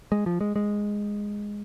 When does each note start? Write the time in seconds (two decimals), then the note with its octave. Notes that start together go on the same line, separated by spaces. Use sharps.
0.12 G#3
0.26 F3
0.41 G#3
0.56 G#3